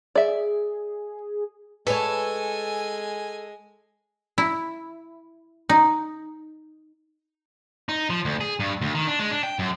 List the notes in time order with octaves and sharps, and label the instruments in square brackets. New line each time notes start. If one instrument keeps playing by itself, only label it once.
[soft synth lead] G#4 [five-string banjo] D5 E5
[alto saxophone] G#3 [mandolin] A4 [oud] B4 C#5 [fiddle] G#5
[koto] E4
D#4
[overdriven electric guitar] D#4
F3
D2
G#4
G2
D2
D#3
D4
G#3
D4
G5
F#2